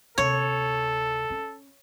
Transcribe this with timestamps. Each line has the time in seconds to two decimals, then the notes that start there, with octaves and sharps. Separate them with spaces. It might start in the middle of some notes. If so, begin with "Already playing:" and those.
0.18 D2 C3 A4 C#5
1.30 C#4